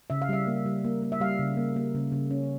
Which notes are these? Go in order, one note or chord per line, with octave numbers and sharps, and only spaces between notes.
C#3 E5
F5
G3 E5
A#3
G3
A#3
A#3
E5
G3 F5
C#3
A#3
A#3
C#3
C#3
C#4